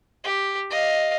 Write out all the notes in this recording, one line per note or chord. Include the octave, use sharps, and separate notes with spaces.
G4
D#5 F5